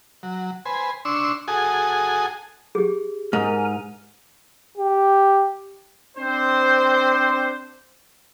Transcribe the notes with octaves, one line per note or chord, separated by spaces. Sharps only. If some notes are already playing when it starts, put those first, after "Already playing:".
F#3
B4 C5 G#5
D4 C6 C#6 E6
F#4 G#4 A4 G#5 D#6
G4 G#4
G#2 A#4 G#5 A#5
G4
C4 D4 C5